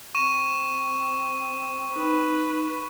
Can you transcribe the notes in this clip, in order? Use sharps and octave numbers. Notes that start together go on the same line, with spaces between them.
C4 C#6 D#7 E7
D#4 B4